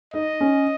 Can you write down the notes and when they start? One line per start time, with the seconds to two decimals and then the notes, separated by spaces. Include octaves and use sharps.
0.14 D#4 D#5
0.41 C#4